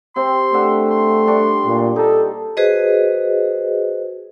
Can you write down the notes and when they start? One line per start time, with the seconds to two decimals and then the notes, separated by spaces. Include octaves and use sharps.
0.16 C3 C4 C6
0.54 A3 D4 E5 F#5
0.90 C6
1.27 G3 D4 C#6
1.66 A#2
1.96 D#4 A4
2.57 F#4 G#4 B4 C5 D#5